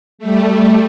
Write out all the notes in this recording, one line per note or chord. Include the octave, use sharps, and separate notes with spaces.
G3 A3